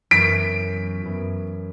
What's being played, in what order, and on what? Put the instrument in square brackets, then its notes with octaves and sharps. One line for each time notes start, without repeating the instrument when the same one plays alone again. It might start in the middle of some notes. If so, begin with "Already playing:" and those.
[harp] F#2 E3 B3 [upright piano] B6 D7
[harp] F#2 E3 B3